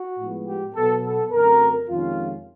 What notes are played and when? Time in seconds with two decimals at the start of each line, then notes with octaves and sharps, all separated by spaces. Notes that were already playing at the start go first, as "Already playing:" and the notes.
Already playing: F#4
0.19 A2 F3 G#3 B3
0.47 G4
0.75 B2 F#3 B3 A4
1.04 A4
1.32 F#2 D3 F#3 A3 C4 A#4
1.89 F2 C3 D#3 G#3 C#4 F4